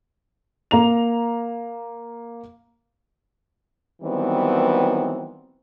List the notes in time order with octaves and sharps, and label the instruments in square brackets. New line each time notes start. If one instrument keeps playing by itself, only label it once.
[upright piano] A#3 A#5 F7
[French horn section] D#3 E3 F#3 G3 B3 C4